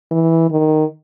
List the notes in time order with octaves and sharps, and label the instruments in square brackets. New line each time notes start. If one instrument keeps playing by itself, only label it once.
[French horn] E3
D#3